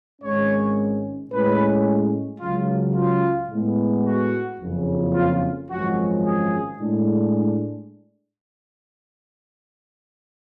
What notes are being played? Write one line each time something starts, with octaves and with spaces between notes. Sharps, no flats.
G#1 G#2 G#3 C#4 C#5
A2 G#3 C#4 B4
C#2 C#3 F#3 F4
F4
A2 G#3 B3
F#4
F#1 F2 C#3
F4
G#1 F#2 F3 G#3 C#4 F#4
G#4
A2 G#3 D4